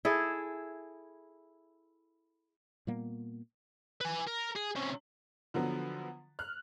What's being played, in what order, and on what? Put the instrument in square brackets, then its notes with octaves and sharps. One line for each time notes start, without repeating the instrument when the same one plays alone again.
[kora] E4 G#4 A4
[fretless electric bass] A#2 G3 A#3 B3
[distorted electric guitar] B4 G#5
A#4
G#4
C3 C#4
[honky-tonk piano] D3 F3 F#3 B3
F6 F#6